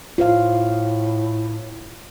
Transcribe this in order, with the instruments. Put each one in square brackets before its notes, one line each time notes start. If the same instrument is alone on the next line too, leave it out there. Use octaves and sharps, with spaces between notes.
[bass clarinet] A2 [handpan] F4 C5 F5